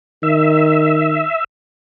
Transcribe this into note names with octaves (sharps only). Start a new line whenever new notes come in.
D#3 E5